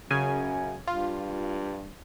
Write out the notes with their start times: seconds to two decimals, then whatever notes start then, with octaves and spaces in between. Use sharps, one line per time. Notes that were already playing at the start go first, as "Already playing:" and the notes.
0.11 F#2 C#3 G#5
0.87 G2 F4